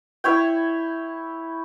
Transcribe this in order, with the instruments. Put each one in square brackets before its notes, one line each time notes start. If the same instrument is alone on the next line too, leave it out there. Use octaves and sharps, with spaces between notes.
[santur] E4 C#5 G5